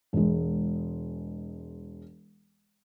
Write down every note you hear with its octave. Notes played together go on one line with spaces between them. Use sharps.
E1 G#3